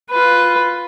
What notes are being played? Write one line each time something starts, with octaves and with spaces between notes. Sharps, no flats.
F4 B4